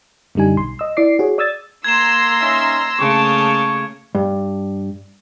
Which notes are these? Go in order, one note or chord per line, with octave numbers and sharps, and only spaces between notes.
F#2 D3 G3 D#4 G#5
B1 C6
D#5 E6
E4 D5 D6 C7
F#4 G#4 C#5
D5 D#6 E6 G#6 A6
A#3 A#5 C6 E6 G#6 E7
C#4 D#4 E5
C#3 A3 A#3 A5 C#6
G2